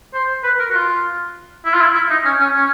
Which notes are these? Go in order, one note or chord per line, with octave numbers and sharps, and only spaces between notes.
C5
B4
A#4
F#4
F4
E4
F4
E4
E4
D#4
C#4
C#4
C#4